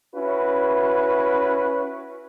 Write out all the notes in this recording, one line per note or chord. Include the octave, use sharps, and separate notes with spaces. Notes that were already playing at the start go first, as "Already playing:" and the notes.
C#4 E4 F#4 B4